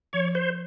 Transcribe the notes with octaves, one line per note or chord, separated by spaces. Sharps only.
F3 C#5
C5